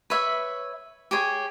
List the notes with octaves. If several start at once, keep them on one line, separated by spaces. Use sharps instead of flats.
B4 C#5 E5
G4 G#4 C#5